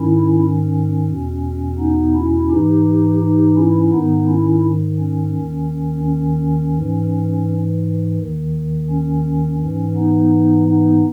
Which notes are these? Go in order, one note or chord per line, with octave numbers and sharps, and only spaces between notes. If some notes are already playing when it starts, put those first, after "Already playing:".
Already playing: G#2 D#3 C#4 E4
C#4
E2 B2
B3 D#4
C#4 E4
G#2 E3 D#4 G4
D#4 G4
C#4 E4
G#2 D#3 B3 D#4
C#4 E4
C#4
D#2 D#3
C#4
G#2 E3
D#2 D#3
C#4
G#2 E3 C#4
B3 D#4
B3 D#4